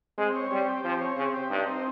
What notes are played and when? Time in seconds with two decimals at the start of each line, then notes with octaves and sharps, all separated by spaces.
0.18 G#3 C4
0.36 C#5
0.51 G3 C4
0.68 G4
0.84 F3 C4
1.01 C#5
1.17 C#3 C4
1.33 G4
1.50 G2 D#4
1.66 C4